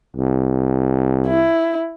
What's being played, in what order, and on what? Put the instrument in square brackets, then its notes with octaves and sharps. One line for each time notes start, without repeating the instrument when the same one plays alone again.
[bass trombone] C2
[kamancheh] E4